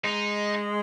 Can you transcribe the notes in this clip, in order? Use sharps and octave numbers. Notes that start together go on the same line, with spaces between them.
G#3 D#4